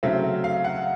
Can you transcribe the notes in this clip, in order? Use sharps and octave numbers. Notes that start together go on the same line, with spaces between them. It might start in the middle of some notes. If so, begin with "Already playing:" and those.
C#3 F#3 A3 C4 E5
F5
F#5